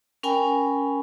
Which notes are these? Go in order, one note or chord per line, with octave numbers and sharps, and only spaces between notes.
C#4 A#4 G5 G#5 B5